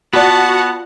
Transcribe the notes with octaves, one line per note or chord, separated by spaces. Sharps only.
B3 F4 F#4 D5 F#5 A5